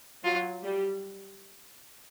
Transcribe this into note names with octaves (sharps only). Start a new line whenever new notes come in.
F#3 F4
G3